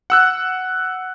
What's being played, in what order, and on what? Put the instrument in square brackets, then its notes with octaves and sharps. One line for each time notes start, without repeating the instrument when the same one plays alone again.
[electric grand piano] F#5 E6 F#6